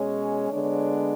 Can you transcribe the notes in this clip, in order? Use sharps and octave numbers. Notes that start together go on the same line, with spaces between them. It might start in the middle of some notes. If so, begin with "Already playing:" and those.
Already playing: B2 G#3 C#4 C#5
D3 G#3 B3 D4 C#5